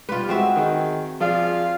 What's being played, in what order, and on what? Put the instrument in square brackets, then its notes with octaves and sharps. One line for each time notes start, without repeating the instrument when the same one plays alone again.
[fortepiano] G3 [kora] F4 B4
[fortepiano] G#3 [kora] C4 F#4 E5
[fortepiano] D#3 D#4 G#4
[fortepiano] F3 G#4 D5 [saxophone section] F4 F5